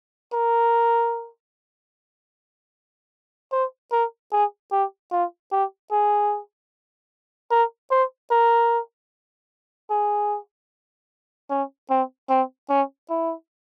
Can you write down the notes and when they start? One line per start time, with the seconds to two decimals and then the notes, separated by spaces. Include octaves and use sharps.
0.33 A#4
3.52 C5
3.92 A#4
4.32 G#4
4.72 G4
5.12 F4
5.52 G4
5.91 G#4
7.51 A#4
7.91 C5
8.31 A#4
9.90 G#4
11.50 C#4
11.90 C4
12.29 C4
12.69 C#4
13.09 E4